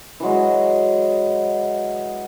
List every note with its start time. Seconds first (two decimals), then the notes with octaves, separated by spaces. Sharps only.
0.20 E3 F#3 G#3